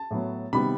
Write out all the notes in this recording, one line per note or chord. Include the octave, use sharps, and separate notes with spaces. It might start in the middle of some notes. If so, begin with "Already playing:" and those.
Already playing: A5
A2 F#3 B3
C3 D#3 G3 B3 B5